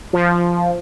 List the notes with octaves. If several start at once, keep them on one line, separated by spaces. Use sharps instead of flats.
F3